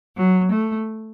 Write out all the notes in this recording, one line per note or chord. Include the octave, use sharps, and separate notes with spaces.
F#3
A3